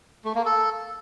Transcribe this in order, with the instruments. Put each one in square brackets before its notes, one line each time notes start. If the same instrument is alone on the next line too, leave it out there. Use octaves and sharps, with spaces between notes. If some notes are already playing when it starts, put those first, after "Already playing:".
[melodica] A3
A#3
A4